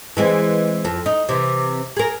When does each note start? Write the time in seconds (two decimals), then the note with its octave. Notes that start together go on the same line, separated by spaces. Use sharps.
0.17 E3 G#3 C4
0.85 F2
1.06 D#4
1.29 C3 E3
1.97 G#4 A#4